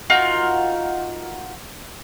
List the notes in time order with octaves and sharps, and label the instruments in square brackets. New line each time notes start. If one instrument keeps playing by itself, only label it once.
[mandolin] D#4 F4 F#4 A#4